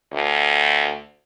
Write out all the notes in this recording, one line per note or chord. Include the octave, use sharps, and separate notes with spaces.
D2